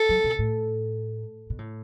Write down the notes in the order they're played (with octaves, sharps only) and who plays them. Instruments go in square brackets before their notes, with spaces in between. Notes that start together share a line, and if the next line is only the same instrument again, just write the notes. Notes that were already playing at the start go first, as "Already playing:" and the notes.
Already playing: [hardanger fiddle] A4
[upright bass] F#3
B2
A2
B2
A2